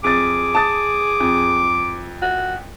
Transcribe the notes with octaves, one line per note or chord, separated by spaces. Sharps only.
F2 G#4 D6 A6
A5 D#6 A6
F2
F#4